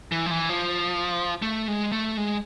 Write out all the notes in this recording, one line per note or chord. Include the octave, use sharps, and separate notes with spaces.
E3
F3
E3
F3
A3
G#3
A3
G#3